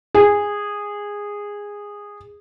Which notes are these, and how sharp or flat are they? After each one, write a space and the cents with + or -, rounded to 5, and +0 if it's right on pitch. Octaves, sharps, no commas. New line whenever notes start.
G#4 -15